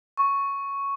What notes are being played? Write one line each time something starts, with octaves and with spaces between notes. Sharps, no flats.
C#6